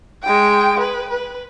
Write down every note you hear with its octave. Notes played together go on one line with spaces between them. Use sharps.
G#3 G5
B4
B4